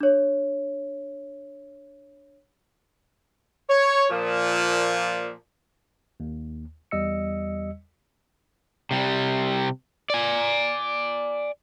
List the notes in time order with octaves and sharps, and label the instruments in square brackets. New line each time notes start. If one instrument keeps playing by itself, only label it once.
[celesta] D4 C#5
[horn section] C#5
A#2 F3
[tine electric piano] D#2
E2 G3 D#5 E6 C#7
[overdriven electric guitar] C3 G3
D5 G#5